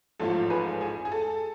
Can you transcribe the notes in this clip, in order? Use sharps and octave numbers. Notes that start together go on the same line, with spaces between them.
A1 G#2 F3 A3 F4 A4
G#4 B4
G#4
G#4
A4